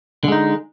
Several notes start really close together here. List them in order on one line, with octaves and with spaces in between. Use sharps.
D3 G#3 D#4